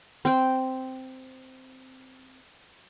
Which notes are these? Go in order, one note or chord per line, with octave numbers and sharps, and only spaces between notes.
C4 G5